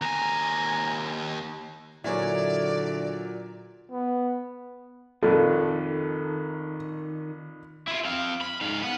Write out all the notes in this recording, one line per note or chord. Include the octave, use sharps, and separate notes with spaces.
D#2 G#5 A#5
A#2 D3 F#3 E4 G#4 C#5 D5
B3
A#1 F2 D#3 A4
E4 F4
C4 F5
B5
G#2 F5
B4 F#5